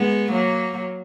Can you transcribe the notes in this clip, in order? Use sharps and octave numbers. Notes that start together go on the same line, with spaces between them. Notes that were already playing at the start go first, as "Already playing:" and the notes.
Already playing: G#3 B3
F#3 A#3